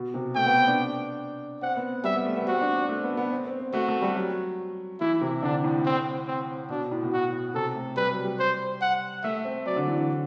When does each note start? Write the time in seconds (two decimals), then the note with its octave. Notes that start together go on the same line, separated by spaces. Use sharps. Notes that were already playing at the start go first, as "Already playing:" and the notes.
Already playing: B2
0.14 C3
0.35 A3 G5
0.46 B3
0.56 C4
0.68 D4
1.62 C4 F#5
1.76 B3
2.04 G3 E5
2.15 B3
2.25 A3
2.37 B3
2.47 C4 F#4
2.61 D4
2.76 C4
2.89 A3
3.03 B3
3.17 B3
3.32 C4
3.46 C4
3.60 C4
3.73 A3 F#4
3.88 A3
4.02 G3
4.16 F#3
5.00 E3 E4
5.21 C3
5.42 D3 D4
5.64 A2
5.86 C4
6.28 C4
6.69 B2 D4
6.91 A2
7.03 B2
7.13 A2 F#4
7.54 C3 A4
7.75 A3
7.96 G3 B4
8.11 F#3
8.25 G3
8.39 C5
8.81 F#5
9.23 A3 E5
9.45 C4
9.66 F#3 D5
9.76 D3
9.87 E3
9.98 D3